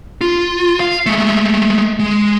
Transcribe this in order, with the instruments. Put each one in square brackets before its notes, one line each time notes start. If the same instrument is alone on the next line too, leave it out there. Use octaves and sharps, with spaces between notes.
[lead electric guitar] F4
F5
G#3 A3
G#3